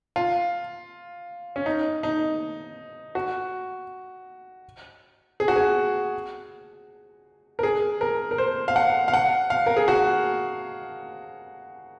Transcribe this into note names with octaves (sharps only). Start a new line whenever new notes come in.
F4
C#4
D#4
D#4
F#4
G#4
F#4
G#4
A#4
G#4
A#4
A#4
C5
F5
F#5
F5
F#5
F5
A#4
G#4
F#4